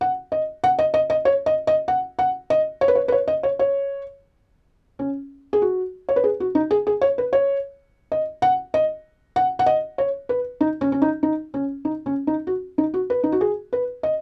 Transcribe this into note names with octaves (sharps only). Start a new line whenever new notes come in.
F#5
D#5
F#5
D#5
D#5
D#5
C#5
D#5
D#5
F#5
F#5
D#5
C#5
B4
C#5
B4
C#5
D#5
C#5
C#5
C#4
G#4
F#4
C#5
B4
G#4
F#4
D#4
G#4
G#4
C#5
B4
C#5
D#5
F#5
D#5
F#5
F#5
D#5
C#5
B4
D#4
C#4
C#4
D#4
D#4
C#4
D#4
C#4
D#4
F#4
D#4
F#4
B4
D#4
F#4
G#4
B4
D#5